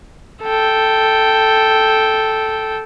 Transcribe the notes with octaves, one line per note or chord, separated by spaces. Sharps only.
A4 G5